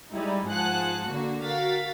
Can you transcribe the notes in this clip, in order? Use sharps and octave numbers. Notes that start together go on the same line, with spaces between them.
G3 G#3 D#4 E4
G#2 F3 G#4 F#5 A5 F#6
D3 A#3 F#4
F#4 A#4 F5 A6 B6